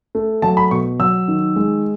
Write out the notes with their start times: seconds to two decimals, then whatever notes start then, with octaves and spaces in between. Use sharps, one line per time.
0.15 A3
0.42 F#3 A5
0.57 B5
0.71 B2 C#6
0.99 F#3 E6
1.28 D#3
1.56 G#3